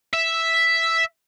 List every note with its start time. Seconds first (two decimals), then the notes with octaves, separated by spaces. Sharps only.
0.14 E5